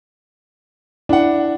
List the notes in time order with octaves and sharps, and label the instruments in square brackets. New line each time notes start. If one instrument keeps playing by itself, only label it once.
[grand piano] D4 F#5 [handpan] E4